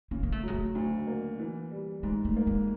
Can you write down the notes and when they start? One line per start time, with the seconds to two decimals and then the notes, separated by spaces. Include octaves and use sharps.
0.11 C#3 A#3
0.23 A#3
0.32 A3
0.43 F#3 G#3
0.54 A3
0.75 D2
1.07 A#3
1.39 E3
1.71 G3
2.03 G#2 G#3
2.25 A3
2.36 A#3
2.47 G#3